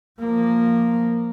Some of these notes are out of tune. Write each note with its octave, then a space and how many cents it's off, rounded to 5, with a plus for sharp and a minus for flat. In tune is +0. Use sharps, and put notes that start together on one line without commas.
F3 +0 A#3 -5